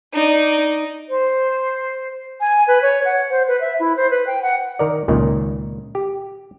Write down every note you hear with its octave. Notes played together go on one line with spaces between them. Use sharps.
D#4 D5
C5
G#5
B4
C#5
F#5
C5
B4
E5
E4
C5
B4
G5
F#5
D#3 A#4 D5
C#2 A#2 D#3
G4